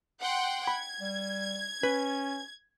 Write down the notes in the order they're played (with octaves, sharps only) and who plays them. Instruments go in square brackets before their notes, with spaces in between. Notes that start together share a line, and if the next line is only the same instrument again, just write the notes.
[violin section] F#5 G5 C6
[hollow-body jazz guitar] B5 [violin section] G#6
[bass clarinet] G3
[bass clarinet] C#4 [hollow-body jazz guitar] B4